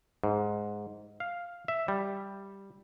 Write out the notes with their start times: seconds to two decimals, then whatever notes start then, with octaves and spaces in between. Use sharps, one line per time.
0.24 G#2
1.20 F5
1.68 E5
1.88 G3